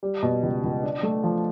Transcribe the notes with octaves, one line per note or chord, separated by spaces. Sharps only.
G3
B2
C#2
C#2
D4
A3
F3